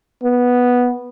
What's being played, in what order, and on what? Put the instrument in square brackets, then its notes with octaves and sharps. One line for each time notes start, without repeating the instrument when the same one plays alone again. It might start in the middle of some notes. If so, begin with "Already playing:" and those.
[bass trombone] B3